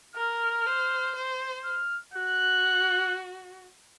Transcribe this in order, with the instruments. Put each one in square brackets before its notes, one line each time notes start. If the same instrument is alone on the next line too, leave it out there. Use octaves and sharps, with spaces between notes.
[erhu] A#4 [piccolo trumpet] F6
[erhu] C5
C5
[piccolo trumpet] F6
[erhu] F#4 [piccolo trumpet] F#6